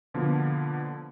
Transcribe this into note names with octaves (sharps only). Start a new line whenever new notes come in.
B2 D3 F3 A#3 B3